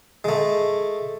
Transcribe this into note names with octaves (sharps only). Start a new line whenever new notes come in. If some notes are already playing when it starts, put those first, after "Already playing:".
G#3 A3